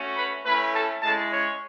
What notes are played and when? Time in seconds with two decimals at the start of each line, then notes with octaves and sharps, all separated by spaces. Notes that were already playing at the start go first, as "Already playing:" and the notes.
Already playing: A3 C#4 F#4
0.17 B4 B5
0.45 A3 C#4 E4 B4 B5
0.74 A4 A5
1.02 G#3 C#4 E4 A4 A5
1.31 C#4 C#5